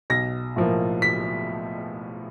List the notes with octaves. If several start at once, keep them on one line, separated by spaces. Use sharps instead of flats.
B1 A#6
A2 F3 A#3
B6